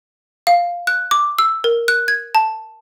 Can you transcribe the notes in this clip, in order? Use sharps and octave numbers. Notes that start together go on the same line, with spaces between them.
F5
F#6
D6
E6
A#4
F#6
G#6
A5